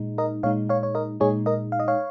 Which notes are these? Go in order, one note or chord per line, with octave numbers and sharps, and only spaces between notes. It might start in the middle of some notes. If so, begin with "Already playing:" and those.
Already playing: A#2 G#3 D#4
A#4 D#5
A#2 G#3 D#4 C#5 F5
C#5 F5
C#5
A#4 D#5
A#2 G#3 D#4 G#4 C#5
A#4 D#5
F5
D#5
C#5 F5